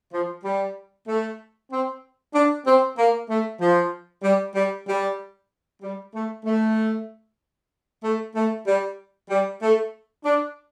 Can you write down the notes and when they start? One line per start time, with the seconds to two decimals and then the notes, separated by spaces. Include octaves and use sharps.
0.13 F3
0.44 G3
1.07 A3
1.71 C4
2.34 D4
2.66 C4
2.97 A#3
3.29 A3
3.60 F3
4.23 G3
4.55 G3
4.88 G3
5.82 G3
6.14 A3
6.45 A3
8.03 A3
8.35 A3
8.67 G3
9.29 G3
9.62 A3
10.25 D4